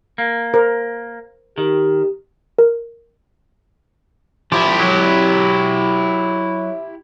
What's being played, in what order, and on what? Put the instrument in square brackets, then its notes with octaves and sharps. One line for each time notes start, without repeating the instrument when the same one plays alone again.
[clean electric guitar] A#3
[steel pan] A#4 C5
[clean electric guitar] D#3 [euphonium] G4
[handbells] A#4
[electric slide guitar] F3 [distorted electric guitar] E4 G4
[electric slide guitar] F#3